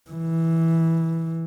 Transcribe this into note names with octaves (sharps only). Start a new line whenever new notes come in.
E3